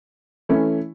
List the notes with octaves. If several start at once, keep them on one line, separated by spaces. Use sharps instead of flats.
E3 A3 C#4 E4